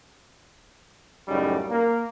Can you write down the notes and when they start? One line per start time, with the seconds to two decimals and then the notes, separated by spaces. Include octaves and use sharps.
1.28 F#2 A2 C#3 G3 C#4 D#4
1.69 A#3